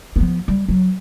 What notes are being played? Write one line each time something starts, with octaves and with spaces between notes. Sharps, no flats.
F3 B3
G3
F#3